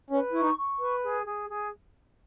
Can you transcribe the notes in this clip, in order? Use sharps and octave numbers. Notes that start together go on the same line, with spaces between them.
C#4 B4
E4 C#6
D#4
C#6
B4
G#4
G#4
G#4